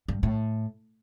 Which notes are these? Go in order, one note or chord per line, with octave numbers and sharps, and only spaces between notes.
G2
A2